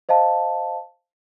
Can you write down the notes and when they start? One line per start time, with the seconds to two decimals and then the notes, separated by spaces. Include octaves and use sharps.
0.09 C5 D#5 F5 A5